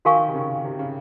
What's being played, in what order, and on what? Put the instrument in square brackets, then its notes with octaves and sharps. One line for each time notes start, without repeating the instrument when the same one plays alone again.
[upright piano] D#3 [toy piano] F#4 A#4 F5 G#5 C#6
[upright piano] C3
C#3
C3
C#3